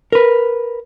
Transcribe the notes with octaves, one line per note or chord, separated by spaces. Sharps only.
A#4 B4